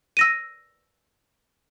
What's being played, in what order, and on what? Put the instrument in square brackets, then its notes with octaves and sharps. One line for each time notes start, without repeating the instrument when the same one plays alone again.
[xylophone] E6 A#6 D#7